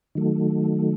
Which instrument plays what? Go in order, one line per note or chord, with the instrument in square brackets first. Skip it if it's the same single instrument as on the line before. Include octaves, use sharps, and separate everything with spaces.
[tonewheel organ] D#3 F#3 A3